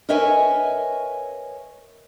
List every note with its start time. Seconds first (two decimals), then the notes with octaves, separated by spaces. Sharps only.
0.09 A#4 B4 C#5 D#5 E5 G#5